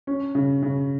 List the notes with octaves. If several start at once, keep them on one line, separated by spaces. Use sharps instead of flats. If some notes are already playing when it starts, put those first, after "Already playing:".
C#4
C#3
C#3